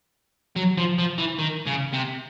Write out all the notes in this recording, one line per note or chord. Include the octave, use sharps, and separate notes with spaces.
F#3
F3
F3
E3
D#3
C#3
C3